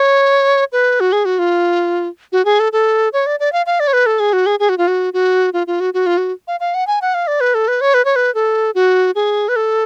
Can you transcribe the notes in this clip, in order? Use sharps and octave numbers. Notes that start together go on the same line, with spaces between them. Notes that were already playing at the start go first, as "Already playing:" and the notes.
Already playing: C#5
B4
F#4
G#4
F#4
F4
F#4
G#4
A4
A4
C#5
D5
D5
F5
F5
D5
C#5
B4
A4
G#4
F#4
G#4
G#4
F#4
F4
F#4
F#4
F4
F4
F#4
F#4
F4
F#4
F5
F5
F#5
G#5
F#5
F5
D5
B4
A4
B4
C#5
B4
C#5
B4
A4
F#4
G#4
B4
A4